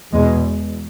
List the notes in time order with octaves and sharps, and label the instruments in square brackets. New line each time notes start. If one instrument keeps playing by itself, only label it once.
[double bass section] E2 B2 G#3